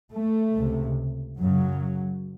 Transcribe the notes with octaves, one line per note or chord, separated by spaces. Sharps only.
A3
C#2 C3
F#2 C#3 F#3